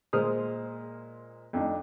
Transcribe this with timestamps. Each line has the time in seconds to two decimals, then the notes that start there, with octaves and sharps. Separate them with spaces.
0.13 A#2 G#3 C5 D#6 F6
1.53 F2 D4 D#4